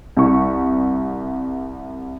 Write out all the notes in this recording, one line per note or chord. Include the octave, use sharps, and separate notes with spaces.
C2 C#6